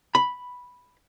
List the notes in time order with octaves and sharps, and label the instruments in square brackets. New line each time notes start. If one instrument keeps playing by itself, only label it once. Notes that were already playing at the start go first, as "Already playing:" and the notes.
[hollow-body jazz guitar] B5